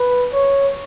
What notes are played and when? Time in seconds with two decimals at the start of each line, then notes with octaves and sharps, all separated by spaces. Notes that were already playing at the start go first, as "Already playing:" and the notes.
Already playing: B4
0.33 C#5